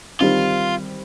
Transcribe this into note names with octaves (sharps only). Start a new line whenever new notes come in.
D#3 G3 C4 F4